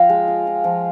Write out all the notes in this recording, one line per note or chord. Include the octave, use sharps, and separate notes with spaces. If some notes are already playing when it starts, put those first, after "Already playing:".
Already playing: F3 F4 D#5 F5 G5
G#3
F4
F4
F3